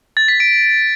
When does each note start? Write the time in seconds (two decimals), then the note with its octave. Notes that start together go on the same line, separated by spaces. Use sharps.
0.17 A6
0.28 B6
0.40 D7